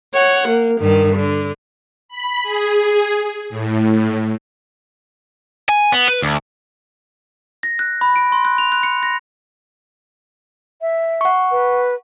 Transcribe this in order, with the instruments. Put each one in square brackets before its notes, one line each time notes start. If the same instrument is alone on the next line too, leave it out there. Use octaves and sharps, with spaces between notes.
[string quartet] C#5 F#5
A#3
G2 D#3
D3
[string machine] B5
G#4
A2
[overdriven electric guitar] G#5
B3
B4
D2
[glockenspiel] A#6
F#6
B5
D7
C6
F#6
F7
F#6
C#7
A#6
[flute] E5
[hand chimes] F#5 C#6
[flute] B4